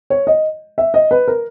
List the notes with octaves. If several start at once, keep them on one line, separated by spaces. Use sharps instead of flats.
C#5
D#5
E5
D#5
B4
A#4